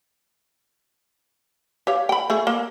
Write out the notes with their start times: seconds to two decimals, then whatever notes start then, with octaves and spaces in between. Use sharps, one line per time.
1.87 G4 C#5 F5
2.09 G5 B5
2.30 A3 G#4
2.47 A#3